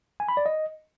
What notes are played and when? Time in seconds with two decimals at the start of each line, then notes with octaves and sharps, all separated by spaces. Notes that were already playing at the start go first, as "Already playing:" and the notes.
0.20 G#5
0.29 B5
0.37 D5
0.46 D#5